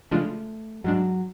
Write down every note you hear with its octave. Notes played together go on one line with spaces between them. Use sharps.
C#3 F3 G#3 A3 D4 F4
G#2 F#3 G#3 D4